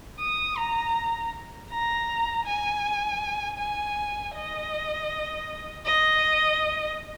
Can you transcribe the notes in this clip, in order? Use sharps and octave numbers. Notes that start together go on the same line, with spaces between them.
D#6
A#5
A#5
G#5
G#5
D#5
D#5